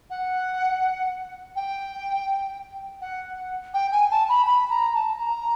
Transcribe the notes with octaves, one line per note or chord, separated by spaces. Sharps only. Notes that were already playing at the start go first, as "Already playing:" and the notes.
F#5
G5
F#5
G5
G#5
A5
B5
B5
A#5
A5
A#5